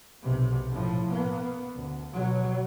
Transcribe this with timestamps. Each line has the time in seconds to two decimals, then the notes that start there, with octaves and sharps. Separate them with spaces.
0.22 B1 C3
0.71 A2 F3
1.11 A#3 B3
1.76 D2
2.13 B2 F#3